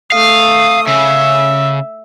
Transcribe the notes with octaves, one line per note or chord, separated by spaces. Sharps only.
A3 F5 D#6
C#3 E5